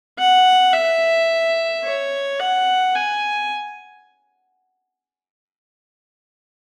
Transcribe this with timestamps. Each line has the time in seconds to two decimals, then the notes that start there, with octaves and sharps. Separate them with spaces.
0.18 F#5
0.73 E5
1.84 C#5
2.39 F#5
2.94 G#5